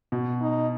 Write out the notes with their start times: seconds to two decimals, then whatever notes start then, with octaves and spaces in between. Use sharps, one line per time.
0.12 B2
0.41 D#4